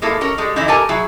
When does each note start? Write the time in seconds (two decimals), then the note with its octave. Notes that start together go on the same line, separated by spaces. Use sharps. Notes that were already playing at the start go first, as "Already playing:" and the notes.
0.02 G#3 A#3 E4 A4
0.21 C#4 A4 A#4
0.38 G3 G#3 A4
0.56 D3 E3 G#3 D#4 E4
0.68 G4 A4 A#4 G#5 A5
0.89 F#3 E4 G#4